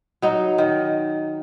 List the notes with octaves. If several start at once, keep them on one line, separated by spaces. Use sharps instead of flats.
F#3 D#4
D#3